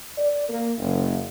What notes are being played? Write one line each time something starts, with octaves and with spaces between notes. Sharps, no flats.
D5
A#3
F#1